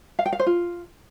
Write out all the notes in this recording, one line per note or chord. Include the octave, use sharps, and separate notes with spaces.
F5
G5
F5
C5
F4